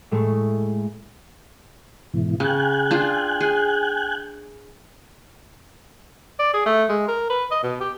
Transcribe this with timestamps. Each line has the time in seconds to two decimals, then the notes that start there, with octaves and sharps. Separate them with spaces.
0.11 A2 G#3 A3
2.14 G#2 B2 E3
2.40 C#3 G5 G#5 F#6
2.91 D4 F4 G#4
3.40 G#4
6.39 D5
6.54 G#4
6.66 A3
6.89 G#3
7.08 A#4
7.30 B4
7.51 D#5
7.63 B2
7.80 G4